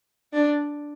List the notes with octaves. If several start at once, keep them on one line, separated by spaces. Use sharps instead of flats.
D4